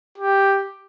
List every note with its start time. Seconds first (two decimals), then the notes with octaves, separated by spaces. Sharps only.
0.18 G4